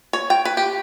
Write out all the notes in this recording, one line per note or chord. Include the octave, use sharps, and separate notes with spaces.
C#5
G5
B4
G4